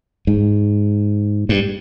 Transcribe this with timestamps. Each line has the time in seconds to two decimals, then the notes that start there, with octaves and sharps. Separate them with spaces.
0.27 G#2
1.49 G2